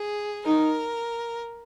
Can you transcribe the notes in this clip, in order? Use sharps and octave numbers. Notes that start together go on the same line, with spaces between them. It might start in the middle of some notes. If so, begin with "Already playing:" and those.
Already playing: G#4
D#4 A#4